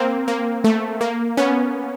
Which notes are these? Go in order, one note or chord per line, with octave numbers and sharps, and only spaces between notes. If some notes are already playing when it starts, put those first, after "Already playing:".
Already playing: A#3 C4
A#3
A3
A#3
B3 C#4